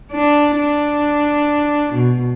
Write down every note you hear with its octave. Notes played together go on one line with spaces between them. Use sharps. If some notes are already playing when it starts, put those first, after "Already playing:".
D4
D4
B2